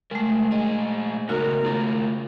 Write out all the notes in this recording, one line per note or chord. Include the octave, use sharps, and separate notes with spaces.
C#3 G#3 A3 A#4
A#2 G#4 D#5
C#3 A3 B3 D#4 F#4 A#4
A3 F4 G#4